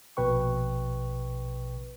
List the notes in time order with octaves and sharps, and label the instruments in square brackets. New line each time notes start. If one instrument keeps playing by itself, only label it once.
[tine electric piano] A#1 B2 B4 G5 C#6